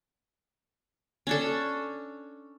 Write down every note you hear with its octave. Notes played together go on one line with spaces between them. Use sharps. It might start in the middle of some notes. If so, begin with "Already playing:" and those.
C#4 D4 A4